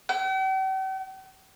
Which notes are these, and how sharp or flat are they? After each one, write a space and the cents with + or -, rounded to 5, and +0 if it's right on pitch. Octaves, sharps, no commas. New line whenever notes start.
G5 -45